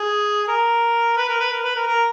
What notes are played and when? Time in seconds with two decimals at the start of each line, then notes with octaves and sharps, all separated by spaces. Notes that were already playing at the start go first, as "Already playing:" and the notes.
Already playing: G#4
0.48 A#4
1.17 B4
1.29 A#4
1.40 B4
1.52 A#4
1.64 B4
1.75 A#4
1.87 A#4